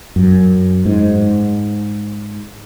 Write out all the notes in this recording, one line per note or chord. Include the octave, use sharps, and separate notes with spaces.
F#2
G#2